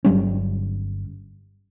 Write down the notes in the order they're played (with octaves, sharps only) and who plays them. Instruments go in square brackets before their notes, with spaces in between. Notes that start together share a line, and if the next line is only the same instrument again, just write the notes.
[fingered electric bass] G1 F#3 G3 C#4